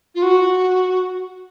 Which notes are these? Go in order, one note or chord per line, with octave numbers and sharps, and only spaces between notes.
F4
F#4